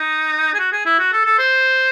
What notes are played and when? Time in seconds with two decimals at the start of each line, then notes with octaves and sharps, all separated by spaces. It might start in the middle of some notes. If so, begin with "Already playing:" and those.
Already playing: D#4
0.54 G#4
0.59 F#4
0.72 G#4
0.86 E4
0.99 F#4
1.12 A4
1.25 A4
1.39 C5